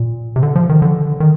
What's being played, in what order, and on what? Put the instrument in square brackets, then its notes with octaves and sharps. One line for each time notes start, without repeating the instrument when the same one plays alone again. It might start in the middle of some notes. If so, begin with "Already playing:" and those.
Already playing: [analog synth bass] A#2
C3
D3
F3
D#3
D3
D#3